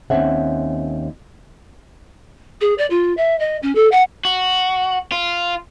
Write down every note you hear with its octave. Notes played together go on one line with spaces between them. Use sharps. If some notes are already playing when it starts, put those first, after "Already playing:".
D#2 A#3 C4 C#4 E5 F#5
G#4
D5
F4
E5
D#5
C#4
A4
F#5
F#4
F4